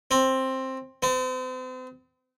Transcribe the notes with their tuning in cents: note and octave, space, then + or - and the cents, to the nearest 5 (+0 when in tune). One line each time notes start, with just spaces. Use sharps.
C4 +10
C4 -40